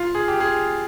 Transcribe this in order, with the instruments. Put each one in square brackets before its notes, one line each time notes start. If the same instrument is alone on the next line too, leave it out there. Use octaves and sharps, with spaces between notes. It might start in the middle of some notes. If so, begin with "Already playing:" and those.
Already playing: [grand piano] F4
G#4
G4
G#4